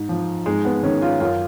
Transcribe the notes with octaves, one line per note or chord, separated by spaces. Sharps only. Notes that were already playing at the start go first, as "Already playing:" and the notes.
Already playing: G#2
F3
G#2 G#3
B3
D#3 C#4
F4
F#2 F4